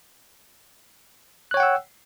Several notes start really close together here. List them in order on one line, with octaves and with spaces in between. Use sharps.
F#6 C#5 G5 F#5 E6